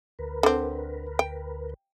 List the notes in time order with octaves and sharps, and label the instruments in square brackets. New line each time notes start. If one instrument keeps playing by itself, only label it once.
[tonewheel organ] D2 A#4 B4
[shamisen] D3 C4
G5